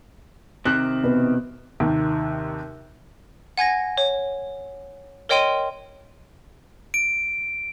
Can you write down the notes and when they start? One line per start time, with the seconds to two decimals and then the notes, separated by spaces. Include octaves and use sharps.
0.65 C3 D#3 C4 F#6
1.03 B2 B4
1.80 D#2 C3 D#3
3.57 F#5 G#5 G#6 A#6
3.97 C#5
5.29 A#4 C#5 D#5 G5 C6 D#7
6.94 D7